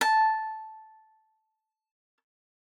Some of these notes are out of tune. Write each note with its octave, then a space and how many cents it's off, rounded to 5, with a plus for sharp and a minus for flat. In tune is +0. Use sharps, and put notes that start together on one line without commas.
A5 -5